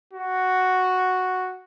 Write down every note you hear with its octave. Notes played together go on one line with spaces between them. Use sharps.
F#4